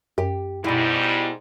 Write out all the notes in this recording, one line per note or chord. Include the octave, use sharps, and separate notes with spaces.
F#2 G4
G#2 B2 G3 E4